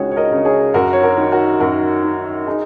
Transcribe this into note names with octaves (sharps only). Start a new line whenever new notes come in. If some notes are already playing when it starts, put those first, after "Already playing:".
Already playing: C#2 C#3 F#4 G#4 C#5
C#5
A#4 D#5
C#3
G#4 C#5
F#2 F#4 A#4
C#5
F#4 A#4
D#3
F#4 A#4
F#2 F#4 A#4
D#3
D#4 G#4